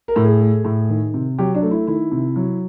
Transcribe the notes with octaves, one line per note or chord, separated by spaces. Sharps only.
A#4
A2
G#4
A3
A2
D#3
C3
F#3 G4
D4
A3
E4
D#3 E4
C3
F#3